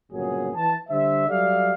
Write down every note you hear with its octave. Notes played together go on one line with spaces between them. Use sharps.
G1 A#2 C#3 F#3 G#4
E3 A5
D3 G3 C5 E5
F#3 G3 A4 D5 E5 F5